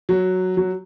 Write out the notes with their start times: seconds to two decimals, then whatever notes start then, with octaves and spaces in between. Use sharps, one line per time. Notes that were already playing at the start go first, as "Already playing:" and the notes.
0.09 F#3
0.57 F#3